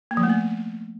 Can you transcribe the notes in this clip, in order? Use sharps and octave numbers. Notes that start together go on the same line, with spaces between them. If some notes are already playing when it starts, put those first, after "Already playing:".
A#3
F3
A3
B3